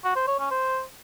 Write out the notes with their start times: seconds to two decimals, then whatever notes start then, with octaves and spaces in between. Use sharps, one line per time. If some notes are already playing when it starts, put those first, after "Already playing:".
0.04 F#4
0.16 C5
0.28 C#5
0.39 C#4
0.51 C5